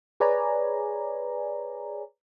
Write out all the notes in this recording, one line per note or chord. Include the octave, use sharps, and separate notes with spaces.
G#4 B4 C#5 D5 G#5 A#5